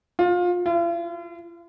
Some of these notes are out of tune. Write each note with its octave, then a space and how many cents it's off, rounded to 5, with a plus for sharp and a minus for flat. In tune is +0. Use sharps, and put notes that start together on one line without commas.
F4 +25
F4 -45